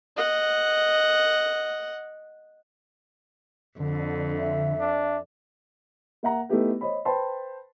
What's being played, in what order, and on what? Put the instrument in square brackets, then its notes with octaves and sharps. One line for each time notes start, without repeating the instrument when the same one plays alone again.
[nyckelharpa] D#5 F#5
[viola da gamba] F2 [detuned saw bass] D3
[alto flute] E5
[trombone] D4
[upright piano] A#3 E5 F#5 A#5
A3 B3 D#4 E4 G4 B4
C5 C#5 D#5 B5
B4 C5 G5 A5 B5 C6